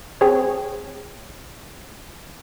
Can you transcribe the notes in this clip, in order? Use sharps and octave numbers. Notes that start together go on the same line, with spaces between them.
C4 G#4 C#5